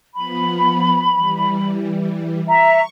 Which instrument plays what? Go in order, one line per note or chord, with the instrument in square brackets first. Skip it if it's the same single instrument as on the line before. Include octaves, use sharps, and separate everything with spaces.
[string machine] F3 B3 [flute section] B5
[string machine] E3 G3
[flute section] E5 A#5 [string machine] C#6